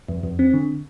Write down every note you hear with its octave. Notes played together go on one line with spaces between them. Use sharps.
F2
F2
C4
D3